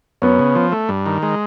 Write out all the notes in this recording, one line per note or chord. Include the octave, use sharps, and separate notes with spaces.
F#2 B3 C#4
C#3
F3
A3
G2
D#3
G#3